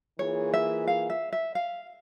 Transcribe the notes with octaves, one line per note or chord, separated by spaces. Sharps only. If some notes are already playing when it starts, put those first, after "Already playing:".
E3 A#3 F4 G#4 C#5
E5
F5
E5
E5
F5